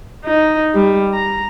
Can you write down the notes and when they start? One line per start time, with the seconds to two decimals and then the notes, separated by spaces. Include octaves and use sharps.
0.25 D#4
0.74 G3
1.13 A#5